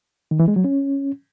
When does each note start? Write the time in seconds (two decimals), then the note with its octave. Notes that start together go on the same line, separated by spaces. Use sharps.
0.31 D#3
0.39 E3
0.48 G#3
0.56 F#3
0.64 C#4